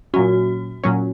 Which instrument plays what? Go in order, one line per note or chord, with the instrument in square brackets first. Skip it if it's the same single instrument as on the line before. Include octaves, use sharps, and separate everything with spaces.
[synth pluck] A#2 F#3 C#4 [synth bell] F#4
[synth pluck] A#2 F#3 C#4